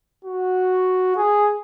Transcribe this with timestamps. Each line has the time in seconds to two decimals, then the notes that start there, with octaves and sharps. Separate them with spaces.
0.25 F#4
1.16 G#4